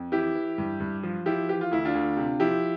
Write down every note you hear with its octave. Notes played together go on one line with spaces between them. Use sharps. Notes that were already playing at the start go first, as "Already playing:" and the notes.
Already playing: F2
E3 E4 G4
E3
G2
G2
F3
F3 E4 G4
E3 G4
F4
D2 E4
D4 F4
D2
C3
F3 E4 G4